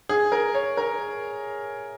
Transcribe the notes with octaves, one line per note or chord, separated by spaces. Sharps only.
G#4
A#4
C#5
A#4